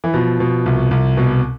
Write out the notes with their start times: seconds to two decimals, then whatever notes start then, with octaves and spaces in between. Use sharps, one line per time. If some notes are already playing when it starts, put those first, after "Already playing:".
0.04 E3
0.14 B2 F3
0.40 B2
0.66 C2
0.91 C2
1.17 B2